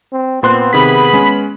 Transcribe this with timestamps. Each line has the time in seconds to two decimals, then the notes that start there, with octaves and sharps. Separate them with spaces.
0.12 C4
0.43 A#2 B3 C4 C6 F#6
0.73 C3 D#3 G#4 B5 B6
1.13 G#3 C#4